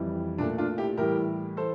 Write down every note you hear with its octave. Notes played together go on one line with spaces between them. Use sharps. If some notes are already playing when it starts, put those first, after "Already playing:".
Already playing: F2 E3 G3
A#2 A3 D4
D4 F4
E4 G4
A2 E3 G3 G4 A#4
E3 A4 C5